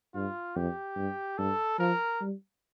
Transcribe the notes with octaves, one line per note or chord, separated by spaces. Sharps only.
G2 F4
F2 G4
G2
G2 A4
F3 A#4
G3